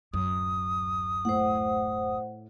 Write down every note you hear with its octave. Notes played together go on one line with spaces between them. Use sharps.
D1 F#2 D#6
A2 C5 F#5